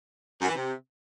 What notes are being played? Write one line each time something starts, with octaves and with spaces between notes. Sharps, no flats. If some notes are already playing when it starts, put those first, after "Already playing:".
F#2
E3
C3